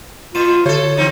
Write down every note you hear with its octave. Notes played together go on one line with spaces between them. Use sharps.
A#2 F4 D#7 E7
D3 A4 C5 C#5
E3 C4 D#4